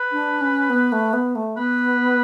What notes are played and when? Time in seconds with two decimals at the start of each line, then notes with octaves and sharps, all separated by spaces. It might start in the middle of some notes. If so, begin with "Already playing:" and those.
Already playing: B4
0.12 D4
0.41 C#4
0.70 B3
0.92 A3
1.13 B3
1.35 A3
1.57 B3 B4